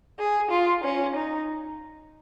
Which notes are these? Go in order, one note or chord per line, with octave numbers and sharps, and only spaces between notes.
G#4
F4
C#4
D#4